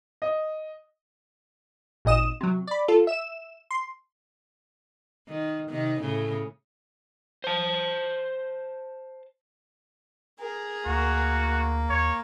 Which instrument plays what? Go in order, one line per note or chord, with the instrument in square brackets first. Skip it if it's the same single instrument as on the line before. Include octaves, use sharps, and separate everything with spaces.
[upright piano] D#5
[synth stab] G#1 A#2 D#5 D#6 E7
C3 F#3
D5 B5
F4 A4
E5 E7
C6
[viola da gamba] D#3
C3 D#3
A2 C#3
[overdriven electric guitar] C5 A5
[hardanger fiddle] G#4 A#4
[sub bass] D2 [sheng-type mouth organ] A#3 [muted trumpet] F#4
[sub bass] D#2 [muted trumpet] C#5